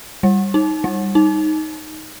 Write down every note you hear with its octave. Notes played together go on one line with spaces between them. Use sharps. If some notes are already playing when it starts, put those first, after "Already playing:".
G3
D#4
G3
D#4